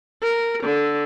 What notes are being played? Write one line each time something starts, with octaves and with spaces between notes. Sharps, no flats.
A#4
D3